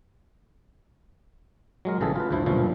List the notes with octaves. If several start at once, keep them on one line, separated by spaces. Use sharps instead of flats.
F#3 G#3 A#4
A1 C#3 E3 G#4 A4
F4 B4
D2 G2 F3 E4
B1 G2 A#2 F3 C#4 E4